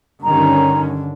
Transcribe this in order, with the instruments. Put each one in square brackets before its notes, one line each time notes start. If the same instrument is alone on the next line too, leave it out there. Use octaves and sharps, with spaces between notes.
[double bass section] G2 D#3 C#4 [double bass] D3 [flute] A#5